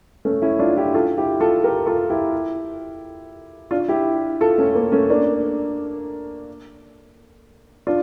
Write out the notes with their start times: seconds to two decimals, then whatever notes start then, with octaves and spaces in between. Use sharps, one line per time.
0.25 A3 C#4
0.42 C#4 E4
0.59 D4 F4
0.77 E4 G4
0.94 F4 A4
1.18 E4 G4
1.40 F4 A4
1.64 G4 A#4
1.86 F4 A4
2.10 E4 G4
3.71 D4 F4
3.88 E4 G4
4.41 F4 A4
4.58 A3 C#4
4.75 A#3
4.92 A3 C#4
5.10 A#3 D4
7.87 D4 F4